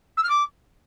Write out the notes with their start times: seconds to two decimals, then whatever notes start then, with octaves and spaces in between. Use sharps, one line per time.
0.17 E6
0.23 F6
0.29 D6